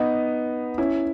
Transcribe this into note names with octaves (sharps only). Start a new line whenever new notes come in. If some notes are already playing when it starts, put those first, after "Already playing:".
Already playing: B3 D#4
C#4 E4